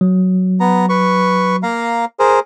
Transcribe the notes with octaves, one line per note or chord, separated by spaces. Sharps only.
F#3
B3 A#5
B4 C#6
A#3 F5 A#5
G#4 A#4 C5